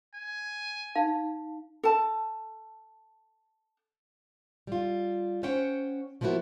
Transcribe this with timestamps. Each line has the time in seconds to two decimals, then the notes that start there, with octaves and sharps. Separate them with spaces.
0.14 G#5
0.95 D#4 F5 A5
1.83 A4 A5
4.67 G3 F4
5.43 C#4 C5 C#5 F#5 G5
6.21 F3 A#3 B3 E4 F#4